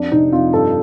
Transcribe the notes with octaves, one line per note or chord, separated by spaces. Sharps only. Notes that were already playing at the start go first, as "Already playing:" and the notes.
Already playing: F2 D4
C3 D#4
F2 F4
G2 A4